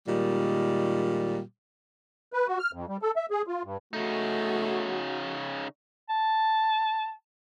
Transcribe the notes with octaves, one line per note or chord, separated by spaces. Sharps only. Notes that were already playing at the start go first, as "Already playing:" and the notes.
A#2 D#3 G3 G#3
B4
F#4
F6
F2
G3
A4
E5
G#4
F4
G2
C#3 A3 D#4 F#4
A5